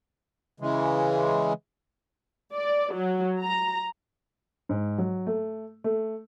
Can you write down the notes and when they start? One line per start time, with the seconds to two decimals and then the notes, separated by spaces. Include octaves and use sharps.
0.60 C#3 E3 G#3
2.53 D5
2.94 F#3
3.41 A#5
4.69 G#2
4.98 F#3
5.27 A3
5.84 A3